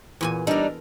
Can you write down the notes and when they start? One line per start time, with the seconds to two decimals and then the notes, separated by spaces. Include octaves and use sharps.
0.21 E2 A#2 G#5
0.47 G3 D4 D#4 A4 A#4